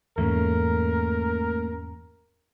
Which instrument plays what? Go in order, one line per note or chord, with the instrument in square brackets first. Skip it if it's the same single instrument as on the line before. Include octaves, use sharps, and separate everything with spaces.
[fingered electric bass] E2 G#2 [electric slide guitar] A3 A#3 C#4 [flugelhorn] A#4